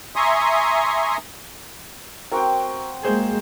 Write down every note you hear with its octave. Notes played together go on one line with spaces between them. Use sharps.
E5 G#5 A#5 C6 C#6 D#6
C4 F#4 A#4 G5
G#3 A#3 G#4 C5 G6